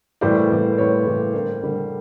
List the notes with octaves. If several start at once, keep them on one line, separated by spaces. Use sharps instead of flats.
A2 E3 G3 A#3 C5 D5
A2 E3 G3 A#3
A2 E3 G3 A#3 B4 C#5
A2 E3 G3 A#3
D3 G3 A#3 A#4 C5
D3 G3 A#3